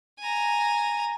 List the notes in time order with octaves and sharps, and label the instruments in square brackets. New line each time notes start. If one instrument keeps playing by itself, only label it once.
[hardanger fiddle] G#5 A#5